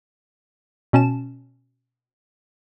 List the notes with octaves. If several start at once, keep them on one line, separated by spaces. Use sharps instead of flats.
B2 C#4 A5 E7